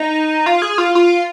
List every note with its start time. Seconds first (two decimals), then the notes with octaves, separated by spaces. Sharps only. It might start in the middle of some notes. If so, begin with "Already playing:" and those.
Already playing: D#4
0.46 F4
0.62 G#4
0.78 F4
0.95 F4